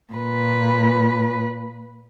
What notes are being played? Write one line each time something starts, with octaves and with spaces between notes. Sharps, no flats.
A#2 B4